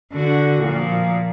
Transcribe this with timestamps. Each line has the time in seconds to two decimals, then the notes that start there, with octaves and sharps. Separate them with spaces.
0.12 D3 F#4
0.61 A#2 F3